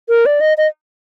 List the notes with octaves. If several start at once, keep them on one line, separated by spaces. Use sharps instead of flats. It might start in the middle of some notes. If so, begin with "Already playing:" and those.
A#4
D5
D#5
D#5